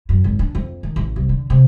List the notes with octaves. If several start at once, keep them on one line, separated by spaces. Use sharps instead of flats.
F#2
G#1
D4
F2
D#3
A1
C2
D3
C3